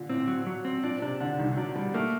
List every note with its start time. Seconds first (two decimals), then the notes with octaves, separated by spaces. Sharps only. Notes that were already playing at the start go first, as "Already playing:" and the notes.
Already playing: A#2 D3
0.10 A2 C4
0.27 F#3
0.47 F#3
0.65 C4
0.84 A#2 D4
1.01 C3 D4
1.20 D3 D4
1.38 C2 D#3
1.57 F#3 D4
1.76 G3 D4
1.94 A3 A#3